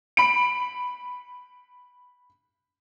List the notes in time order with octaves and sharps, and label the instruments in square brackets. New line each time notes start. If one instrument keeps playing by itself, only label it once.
[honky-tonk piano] B5 D7